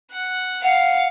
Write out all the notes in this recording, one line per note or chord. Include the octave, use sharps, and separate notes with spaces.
F#5
F5 F#5